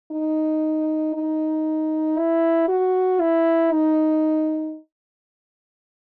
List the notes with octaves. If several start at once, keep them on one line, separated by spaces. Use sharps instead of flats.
D#4
D#4
E4
F#4
E4
D#4